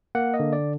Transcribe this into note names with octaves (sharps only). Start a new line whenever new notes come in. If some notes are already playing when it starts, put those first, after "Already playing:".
A#3 F#5
D#5
D3
D5